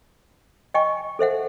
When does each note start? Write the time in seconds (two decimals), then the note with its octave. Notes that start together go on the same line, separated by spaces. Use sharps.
0.74 D#5 G5 G#5 C#6
1.19 A4 C5 E5 F#5